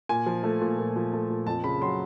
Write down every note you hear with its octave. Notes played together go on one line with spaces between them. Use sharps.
A#2 G#5
F3
A3
A#2
A#2
F3
A3
A#2
F2 A5
C#3 B5
F#3 C6